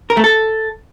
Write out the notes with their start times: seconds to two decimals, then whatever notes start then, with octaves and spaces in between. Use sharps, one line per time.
0.10 A#4
0.17 A3
0.24 A4